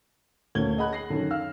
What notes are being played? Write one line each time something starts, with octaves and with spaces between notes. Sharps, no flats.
D2 A#3 C#4 G#6 G7
G#4 D#5 F#5 B5 F#6
A#6 C7 F#7
F#2 D3 D#3
F5 E6 F6